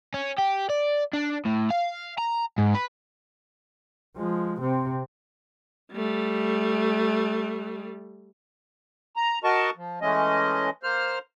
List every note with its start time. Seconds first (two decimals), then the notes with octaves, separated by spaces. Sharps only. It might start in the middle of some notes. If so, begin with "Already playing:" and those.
0.14 C#4
0.38 G4
0.69 D5
1.13 D4
1.45 A2
1.70 F5
2.18 A#5
2.58 G#2
2.74 B4
4.17 F3 G#3
4.60 C3 C4
5.93 G3 A3
9.16 A#5
9.44 F#4 A#4 D#5 A5 C#6
9.77 F3
10.01 E3 G#3 A3 C#4 D#5
10.83 A#3 C5 F6